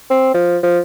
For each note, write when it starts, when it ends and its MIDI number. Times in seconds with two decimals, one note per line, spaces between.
0.10 0.32 60
0.34 0.58 53
0.63 0.79 53